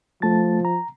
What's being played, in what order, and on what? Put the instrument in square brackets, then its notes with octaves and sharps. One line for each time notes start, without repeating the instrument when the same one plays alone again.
[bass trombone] F3 [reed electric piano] A3 A5 A6
[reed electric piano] A#5